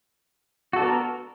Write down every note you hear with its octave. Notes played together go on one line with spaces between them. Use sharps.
B3 D4 F#4 A4 A#4